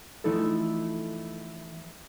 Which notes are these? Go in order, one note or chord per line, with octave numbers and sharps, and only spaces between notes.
E3 F3 A3 D#4 E4 A4